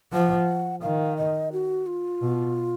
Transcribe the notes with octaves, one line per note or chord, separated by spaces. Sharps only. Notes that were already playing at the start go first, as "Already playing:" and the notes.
F3 F#5
D#3 F5
D#5
F#4
F4
B2